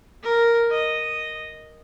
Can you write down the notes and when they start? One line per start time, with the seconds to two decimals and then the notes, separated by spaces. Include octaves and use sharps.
0.23 A#4
0.71 D#5